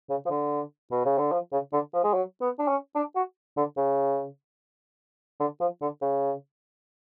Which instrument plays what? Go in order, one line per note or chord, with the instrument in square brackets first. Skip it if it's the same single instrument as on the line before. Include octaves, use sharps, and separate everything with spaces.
[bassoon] C#3
F3
D3
B2
C#3
D3
F3
C#3
D3
F3
G#3
F#3
B3
D4
C#4
D4
F#4
D3
C#3
D3
F3
D3
C#3